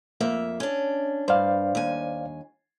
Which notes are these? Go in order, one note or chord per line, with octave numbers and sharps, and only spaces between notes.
F2 A#3 E5
C#4 D4
G2 C5 D5 F5
D#2 G#5